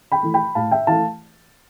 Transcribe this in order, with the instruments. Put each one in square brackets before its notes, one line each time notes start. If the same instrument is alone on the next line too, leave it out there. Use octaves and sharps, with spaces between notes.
[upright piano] G5 B5
E3 A3
G5 B5
A2 F5 A5
E5 G5
E3 A3 F5 A5